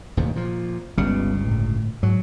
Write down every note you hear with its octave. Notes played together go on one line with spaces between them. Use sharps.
D1 D#2 C3
A#2 F3
G1 C#2 C#3 G3 A3 B3
A2
G#2 F#3